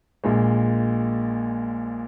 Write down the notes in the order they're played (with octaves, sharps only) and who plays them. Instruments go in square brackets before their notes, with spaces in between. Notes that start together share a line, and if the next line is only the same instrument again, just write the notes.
[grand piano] A#1 A#2 G#3